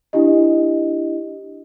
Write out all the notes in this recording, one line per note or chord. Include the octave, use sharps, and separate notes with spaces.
D4 E4 G4 D#5